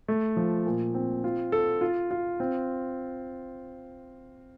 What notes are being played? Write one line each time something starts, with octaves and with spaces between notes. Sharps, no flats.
A3
F3
A#2
C4
F4
A4
F4
F4
C4